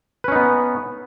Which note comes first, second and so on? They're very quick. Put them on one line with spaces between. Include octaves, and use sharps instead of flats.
B4 C#4 D#4 B3